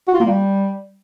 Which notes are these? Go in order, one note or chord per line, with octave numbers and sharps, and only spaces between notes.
F#4
F4
A#3
G3